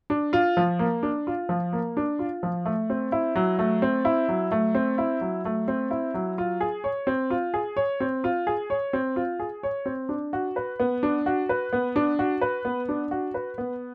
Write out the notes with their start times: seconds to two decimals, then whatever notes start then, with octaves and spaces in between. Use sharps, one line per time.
0.10 D4
0.33 F4
0.57 F3
0.79 A#3
1.03 D4
1.27 F4
1.49 F3
1.73 A#3
1.97 D4
2.19 F4
2.43 F3
2.66 A3
2.90 C4
3.12 E4
3.35 F#3
3.59 A3
3.82 C4
4.05 E4
4.29 F#3
4.52 A3
4.75 C4
4.98 E4
5.21 F#3
5.45 A3
5.68 C4
5.91 E4
6.14 F#3
6.38 F4
6.61 G#4
6.84 C#5
7.07 C4
7.30 F4
7.54 G#4
7.77 C#5
8.00 C4
8.24 F4
8.47 G#4
8.70 C#5
8.93 C4
9.16 F4
9.40 G#4
9.63 C#5
9.86 C4
10.09 D4
10.33 F#4
10.56 B4
10.80 B3
11.03 D4
11.26 F#4
11.49 B4
11.73 B3
11.96 D4
12.19 F#4
12.41 B4
12.65 B3
12.89 D4
13.11 F#4
13.34 B4
13.58 B3